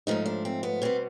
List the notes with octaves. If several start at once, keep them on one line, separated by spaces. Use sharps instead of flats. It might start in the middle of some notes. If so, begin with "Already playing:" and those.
G#2 F3 A3 D#4
D4
C4
B3
B2 G3 B3 C4